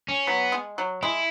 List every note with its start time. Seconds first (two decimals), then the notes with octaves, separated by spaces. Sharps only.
0.08 C#4
0.27 F#3 B3
0.52 G#3
0.78 F#3
1.03 G#3 E4